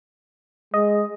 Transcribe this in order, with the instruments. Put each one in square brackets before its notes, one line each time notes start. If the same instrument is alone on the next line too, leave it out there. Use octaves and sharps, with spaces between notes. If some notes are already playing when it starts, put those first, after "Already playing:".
[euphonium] G#3 [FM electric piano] D#5